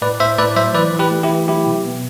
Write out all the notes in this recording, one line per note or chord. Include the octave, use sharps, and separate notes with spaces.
A2 B4 D5
A2 C5 E5
A2 B4 D5
F#3 C5 E5
E3 B4 D5
E3
G4 B4
A3
E4 G4
E3
F#3 E4 G4
B2
B3